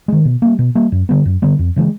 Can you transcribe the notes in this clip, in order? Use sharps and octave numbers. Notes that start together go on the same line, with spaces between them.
D#3 G#3
B2
G3 A#3
B2
G3 A#3
F#2
D3 G3 B3
F#2
D3 G3 B3
F2
C#3 E3 G#3